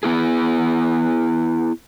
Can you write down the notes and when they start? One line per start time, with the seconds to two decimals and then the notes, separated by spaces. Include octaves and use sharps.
0.03 B3 E4 G#4